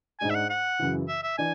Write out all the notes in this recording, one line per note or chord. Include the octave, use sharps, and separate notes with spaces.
G#2 G#3 D4 G#5
E5
F#5
F#5
F#2 C#3 E3
E5
E5
E3 D4 G#5